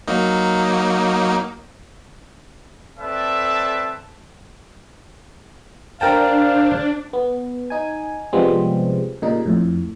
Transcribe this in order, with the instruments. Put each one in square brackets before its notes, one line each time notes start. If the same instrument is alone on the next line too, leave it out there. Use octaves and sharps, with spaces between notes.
[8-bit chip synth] F#3 A#3 D#4
[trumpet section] C4 A4 B4 D5 E5 A5
[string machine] D4 [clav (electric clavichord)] A#4 G5 A5 [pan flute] C5 [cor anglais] F5
[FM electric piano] B3
D#4 G#5
C3 F3 G3 G#3 B3 C4
A#2 C#3 G3 D#4
F2 A2